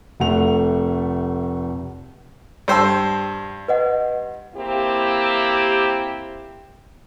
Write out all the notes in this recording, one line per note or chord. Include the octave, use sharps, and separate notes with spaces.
F1 A3 F#5 F7
G2 C5 D5 G5 A5 E6
B4 D#5 F#5
A#3 C4 E4 G4